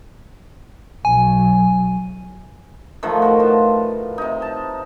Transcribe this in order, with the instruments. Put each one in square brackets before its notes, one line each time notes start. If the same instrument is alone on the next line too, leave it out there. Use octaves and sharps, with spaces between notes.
[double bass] B1 F#3 [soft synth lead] G#5
[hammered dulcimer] D#3 F3 A3 F#5
F#4 A#4 B4
A2 F4 A5
C3 D#4
A5